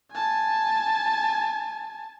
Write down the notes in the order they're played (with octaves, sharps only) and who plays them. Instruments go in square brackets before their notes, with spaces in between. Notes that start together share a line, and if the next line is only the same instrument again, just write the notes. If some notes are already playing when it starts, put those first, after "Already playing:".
[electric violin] G#5 A5